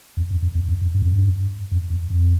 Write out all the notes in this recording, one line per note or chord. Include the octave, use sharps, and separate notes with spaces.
E2
F2
F2
E2
F2
F2
G2
F2
G2
F2
E2
F2